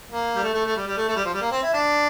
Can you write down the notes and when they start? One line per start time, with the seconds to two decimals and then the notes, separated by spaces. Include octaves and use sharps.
0.11 A#3
0.36 G3
0.43 A3
0.54 A3
0.65 A3
0.77 G3
0.87 G3
0.97 A3
1.08 A3
1.16 G3
1.25 F3
1.33 G3
1.41 A#3
1.52 C4
1.63 E4
1.73 D4